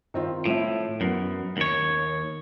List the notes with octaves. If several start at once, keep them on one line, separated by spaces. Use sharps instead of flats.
D#3 C4 F4
A2 F3 E4
F#2 B3
D#2 C#5